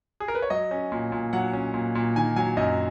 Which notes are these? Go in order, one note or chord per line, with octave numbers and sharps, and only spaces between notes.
G#4
A#4
B4
C#5
F#3 D#5
C#4
A#2
A#2
F#3 F#5
C#4
A#2
A#2
D#3 G#5
F#3 G#5
F#2 D#5